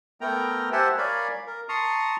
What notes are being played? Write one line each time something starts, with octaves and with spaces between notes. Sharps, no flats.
A3 B3 A#4 G5 A#5
G4 C5 E5 F#5 G#5 A5
A#4 C#5 D5 F5 G#5 B5
A#4
A5 A#5 C6 C#6 D#6